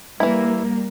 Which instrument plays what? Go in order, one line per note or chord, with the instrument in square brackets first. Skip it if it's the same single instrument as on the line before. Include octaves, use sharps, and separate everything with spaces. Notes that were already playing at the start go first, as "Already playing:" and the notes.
[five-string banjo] E3 E4 [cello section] G3 A#3